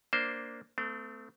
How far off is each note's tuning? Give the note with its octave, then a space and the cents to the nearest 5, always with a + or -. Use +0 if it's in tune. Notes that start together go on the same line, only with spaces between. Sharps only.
A#3 +0 D4 +0 C5 +0
A3 +15 C4 -40